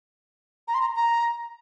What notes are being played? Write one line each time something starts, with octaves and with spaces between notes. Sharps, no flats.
A#5
C6
A#5
A#5